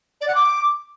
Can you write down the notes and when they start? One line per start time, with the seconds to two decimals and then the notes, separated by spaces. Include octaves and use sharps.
0.21 D5
0.27 F#5
0.34 D6